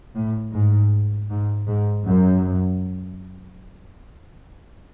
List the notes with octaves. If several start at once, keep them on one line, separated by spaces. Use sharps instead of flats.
A2
G#2
G#2
G#2
F#2